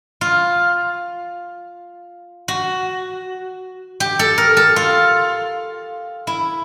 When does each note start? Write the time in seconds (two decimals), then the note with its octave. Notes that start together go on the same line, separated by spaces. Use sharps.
0.21 F4
2.48 F#4
4.00 G4
4.19 A4
4.38 A#4
4.57 A4
4.76 F4
6.27 E4